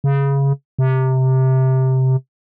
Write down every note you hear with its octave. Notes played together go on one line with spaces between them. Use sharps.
C#3
C3